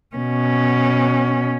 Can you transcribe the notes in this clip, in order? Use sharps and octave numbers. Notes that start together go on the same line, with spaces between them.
B2 C#4